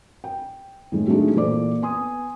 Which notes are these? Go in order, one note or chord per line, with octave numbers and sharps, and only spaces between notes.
G5
A2 D#3 G#3
F#3 G#3 A3 D4 D#4 G#4
A#2 E3 A4 C5 D5 D6
B3 G#5 C6 D#6